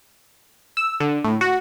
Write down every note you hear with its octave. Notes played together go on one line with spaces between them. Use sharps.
E6
D3
A2
F#4